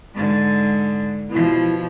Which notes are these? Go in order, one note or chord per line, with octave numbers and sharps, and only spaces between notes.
G#2 D3
B2 F3 E4